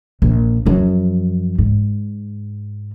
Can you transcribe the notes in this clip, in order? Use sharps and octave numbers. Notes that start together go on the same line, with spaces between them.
A#1
F#2 F3
G#2